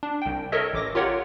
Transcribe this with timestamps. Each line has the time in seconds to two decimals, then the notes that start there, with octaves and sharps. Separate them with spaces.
0.03 D4
0.22 C2 G5
0.52 A4 A#4 C#5 D#5 E5
0.73 A1 D6 A#6
0.95 F4 G4 A#4 C#5 F#5